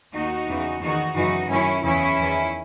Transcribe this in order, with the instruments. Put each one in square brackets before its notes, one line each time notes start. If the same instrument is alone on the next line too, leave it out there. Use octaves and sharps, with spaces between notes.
[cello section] D#2 D#3 D#4 F#4
E2 C#3 E3
E2 D#3 D#4 F#4
F#2 C#3 E3 D#4 F#4
F#2 D#3 C#4 E4
E2 C#3 E3 C#4 E4
E2 D#3